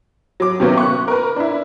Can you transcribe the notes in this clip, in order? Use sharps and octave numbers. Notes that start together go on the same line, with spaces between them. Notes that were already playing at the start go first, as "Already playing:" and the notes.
F#3 D6
C3 D#3 F#3 A#3 B3 C#4
C#6 F#6
A#4 B4
D4 E4